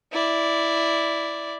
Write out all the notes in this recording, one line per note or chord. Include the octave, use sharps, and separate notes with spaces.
E4 D5